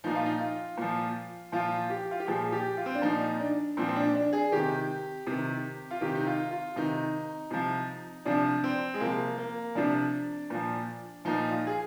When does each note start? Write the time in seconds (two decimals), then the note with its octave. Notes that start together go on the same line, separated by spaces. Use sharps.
0.04 A#2 F3 D#4
0.15 F4
0.26 D#4
0.40 F4
0.77 A#2 F3
1.52 A#2 F3 F4
1.90 G4
2.11 F4
2.20 G4
2.27 A#2 F3 G#4
2.52 G4
2.77 F4
2.86 C4
2.95 D4
3.02 A#2 F3 D#4
3.40 D4
3.77 A#2 F3 C4
3.88 C4
3.96 D4
4.15 D4
4.33 G#4
4.52 C3 D#3 G4
5.27 C3 D#3
5.91 F4
6.01 C3 D#3 G4
6.15 D#4
6.26 F4
6.51 F4
6.76 C3 D#3 D#4
7.51 C3 F3
8.25 C3 F3 D4
8.64 C4
8.94 G#3
9.01 C3 F3 A#3
9.38 A#3
9.75 C3 F3 D4
10.50 A#2 F3
11.25 A#2 F3 D#4
11.51 F4
11.67 G#4